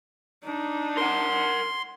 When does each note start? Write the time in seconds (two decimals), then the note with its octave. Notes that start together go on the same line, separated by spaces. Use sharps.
0.44 D4 D#4
0.97 A#4 F#5 C6